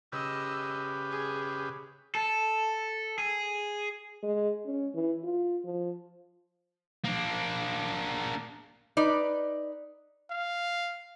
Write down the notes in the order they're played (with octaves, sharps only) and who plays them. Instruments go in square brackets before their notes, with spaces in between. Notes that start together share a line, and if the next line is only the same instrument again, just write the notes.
[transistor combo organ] C#3 G4 B4 [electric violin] D#5 E6
[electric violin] G#4
[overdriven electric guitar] A4
G#4
[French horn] G#3
C#4
E3
F4
F3
[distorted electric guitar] A#3 D4
[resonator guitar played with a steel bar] D#4 B4 D5
[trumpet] F5